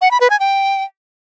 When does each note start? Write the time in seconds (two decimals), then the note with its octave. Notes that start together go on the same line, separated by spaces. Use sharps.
0.01 F#5
0.11 B5
0.21 B4
0.30 G#5
0.40 G5